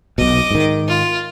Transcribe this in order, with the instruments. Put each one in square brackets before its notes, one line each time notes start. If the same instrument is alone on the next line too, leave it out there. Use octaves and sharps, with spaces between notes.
[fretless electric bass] B1 B2 [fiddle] D#5 D6
[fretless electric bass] G#2 D#3
[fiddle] F4